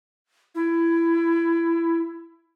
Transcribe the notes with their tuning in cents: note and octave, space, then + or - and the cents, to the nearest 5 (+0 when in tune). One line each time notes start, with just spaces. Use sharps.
E4 +20